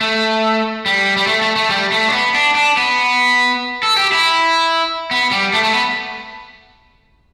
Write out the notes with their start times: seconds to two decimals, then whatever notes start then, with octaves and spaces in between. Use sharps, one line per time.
0.01 A3
0.86 G3
1.17 G3
1.27 A3
1.42 A3
1.56 A3
1.70 G3
1.92 A3
2.09 D4
2.13 B3
2.35 D4
2.55 D4
2.77 B3
3.83 A4
3.97 G4
4.12 E4
5.11 B3
5.31 G3
5.53 A3
5.63 A3
5.74 B3